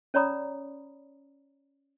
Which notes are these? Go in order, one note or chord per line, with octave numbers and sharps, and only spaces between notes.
C#4 C#5 D5 A#5 B5 D#6